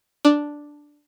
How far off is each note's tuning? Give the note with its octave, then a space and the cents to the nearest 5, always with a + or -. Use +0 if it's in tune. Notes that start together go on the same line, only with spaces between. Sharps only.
D4 +0